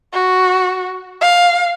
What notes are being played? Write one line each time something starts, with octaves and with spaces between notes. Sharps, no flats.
F#4
F5